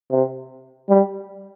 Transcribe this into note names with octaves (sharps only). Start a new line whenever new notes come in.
C3
G3